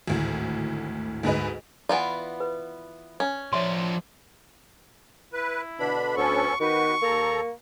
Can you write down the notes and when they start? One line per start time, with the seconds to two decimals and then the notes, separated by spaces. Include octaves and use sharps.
0.08 G#1 D2 A2
1.23 D2 G#2 G#4 B4 D#5
1.89 E3 B3 F4 D5 F#5
2.40 B4
3.20 C#4
3.53 F3 C#5 D5 E5 C6
5.33 E4 B4
5.79 B2 D3 D4 B5
6.17 D2 B3 C#4 A4 C#6
6.60 D#3 B3 F#4 B4 C#6
7.02 D#2 A#3 A4 A#5